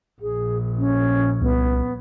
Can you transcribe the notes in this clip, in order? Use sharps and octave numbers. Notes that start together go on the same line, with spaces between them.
A#1 G#4
C#4
C2 B3